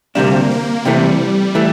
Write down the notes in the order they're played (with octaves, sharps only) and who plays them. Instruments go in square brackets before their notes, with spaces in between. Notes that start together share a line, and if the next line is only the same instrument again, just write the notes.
[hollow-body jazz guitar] D2 C3 G3 D4 [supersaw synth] A#3
[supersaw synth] A#3
[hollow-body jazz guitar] C3 E3 A3 [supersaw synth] G3
[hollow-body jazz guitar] E3 A3